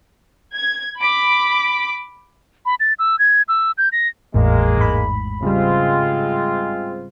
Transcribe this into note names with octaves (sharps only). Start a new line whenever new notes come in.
G#6
B5 D6 B6
B5
A6
E6
G#6
E6
G6
A#6
G#1 E2 A2 G#3 A#3
G#2 B5
C#3 G3 G#3 C4 F4